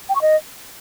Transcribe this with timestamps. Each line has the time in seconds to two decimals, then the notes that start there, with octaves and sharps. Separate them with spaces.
0.09 G5
0.15 C#6
0.22 D#5